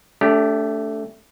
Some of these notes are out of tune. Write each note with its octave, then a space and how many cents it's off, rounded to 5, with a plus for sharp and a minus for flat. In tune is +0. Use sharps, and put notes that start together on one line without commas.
A3 +0 D4 -35 G4 +0